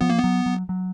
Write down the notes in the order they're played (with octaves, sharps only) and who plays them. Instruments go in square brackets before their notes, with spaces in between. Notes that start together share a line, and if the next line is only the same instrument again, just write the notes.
[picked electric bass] F3 [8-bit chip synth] B3
[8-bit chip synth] A#3
[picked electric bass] F#3 [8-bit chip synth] B3
[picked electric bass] F#3
F#3